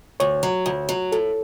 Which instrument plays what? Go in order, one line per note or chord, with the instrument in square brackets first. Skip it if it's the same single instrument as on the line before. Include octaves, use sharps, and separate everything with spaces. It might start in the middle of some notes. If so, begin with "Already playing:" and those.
[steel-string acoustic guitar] D2 [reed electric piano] C#5
[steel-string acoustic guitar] F#3
D2
F#3
[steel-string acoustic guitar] A2 [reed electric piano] A4